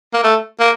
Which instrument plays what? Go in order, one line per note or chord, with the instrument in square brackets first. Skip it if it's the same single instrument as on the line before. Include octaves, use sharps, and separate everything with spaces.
[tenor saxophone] A#3
A3
A#3